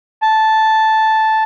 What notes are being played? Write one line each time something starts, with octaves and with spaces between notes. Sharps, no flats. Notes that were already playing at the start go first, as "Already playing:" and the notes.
A5